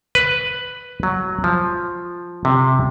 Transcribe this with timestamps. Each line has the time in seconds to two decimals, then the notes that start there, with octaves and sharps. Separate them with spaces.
0.15 B4
1.03 F#3
1.44 F3
2.45 C3